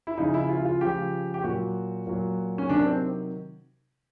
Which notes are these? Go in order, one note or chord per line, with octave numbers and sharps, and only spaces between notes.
E4
C#3 F3 D#4
E4
F4
F4
C#3 F3 G4
G4
A#2 F#3 F#4
A#2 F#3
C#4
C3 D#3 F#3 D4
C4